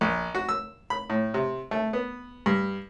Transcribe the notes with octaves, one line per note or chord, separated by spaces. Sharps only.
A#1
F#4
E6
B5
A2
C3
A3
B3
G2